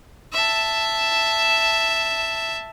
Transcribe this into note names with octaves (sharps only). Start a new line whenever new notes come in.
E5 A5